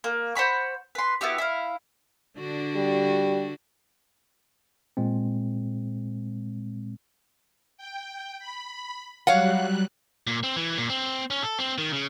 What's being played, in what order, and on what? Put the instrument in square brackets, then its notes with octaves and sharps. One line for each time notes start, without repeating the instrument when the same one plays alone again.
[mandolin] A#3
C5 F#5 B5 C#6
B4 C6
B3 E4 F#4 G4
E4 F5
[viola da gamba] D3 D4 F#4
[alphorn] G3
[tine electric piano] A#2 G#3 C4
[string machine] G5
B5
[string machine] F#3 G3 F#6 [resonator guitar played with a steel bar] C#5 F5 F#5
[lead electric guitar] A#2
C4
E3
A#2
C4
C#4
A4
C4
D#3
C#3